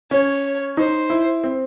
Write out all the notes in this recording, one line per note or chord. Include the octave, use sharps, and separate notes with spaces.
C#4 C#5
D#4 C5
E4
C4